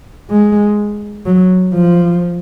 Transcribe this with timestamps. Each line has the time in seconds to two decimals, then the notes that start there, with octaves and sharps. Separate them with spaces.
0.30 G#3
1.26 F#3
1.73 F3